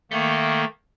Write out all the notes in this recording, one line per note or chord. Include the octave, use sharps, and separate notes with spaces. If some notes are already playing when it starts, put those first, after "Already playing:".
D#3 A3 A#3